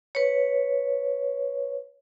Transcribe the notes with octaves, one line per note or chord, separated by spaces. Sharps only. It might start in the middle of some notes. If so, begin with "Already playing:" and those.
B4 C#5